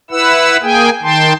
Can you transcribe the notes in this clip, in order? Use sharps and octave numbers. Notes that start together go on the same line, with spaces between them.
E4 B4 F#5 E6
A#3 G#4 G5 G#5
D#3 G5 A5 C6